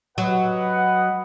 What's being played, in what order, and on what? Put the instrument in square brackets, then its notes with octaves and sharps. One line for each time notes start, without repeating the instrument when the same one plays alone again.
[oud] F#3 [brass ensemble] B4 D#5 F#5